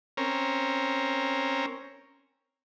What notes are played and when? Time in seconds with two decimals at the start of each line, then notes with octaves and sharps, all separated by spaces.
0.17 C4 C#4 A#4